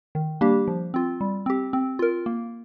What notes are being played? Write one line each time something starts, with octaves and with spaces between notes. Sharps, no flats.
D#3
G3 A#3 D4 G4
F3
C4 F4
G3
C4 G4
C4
F4 A#4
A#3